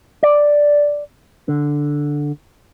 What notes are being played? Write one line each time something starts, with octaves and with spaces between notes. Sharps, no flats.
D5
D3